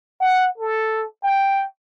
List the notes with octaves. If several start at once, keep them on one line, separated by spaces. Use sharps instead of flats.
F#5
A4
G5